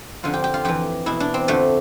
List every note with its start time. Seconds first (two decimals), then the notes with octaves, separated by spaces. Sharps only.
0.23 F2 D3 F3 F4
0.34 G4
0.44 G4
0.54 F4
0.65 F2 E3 G4
1.06 E2 B2 E4
1.20 D4
1.34 C4
1.48 F2 D3 F3 A3